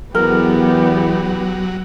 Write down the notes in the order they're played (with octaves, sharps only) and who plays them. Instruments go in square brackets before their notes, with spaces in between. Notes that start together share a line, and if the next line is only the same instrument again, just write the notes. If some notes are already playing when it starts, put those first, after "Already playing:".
[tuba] E2 [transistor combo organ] F#3 [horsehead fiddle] B3 G4 [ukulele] A#4